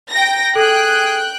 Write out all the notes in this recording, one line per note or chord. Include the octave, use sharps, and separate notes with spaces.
G5 A#5 A#6
G#4 A4 G5 F#6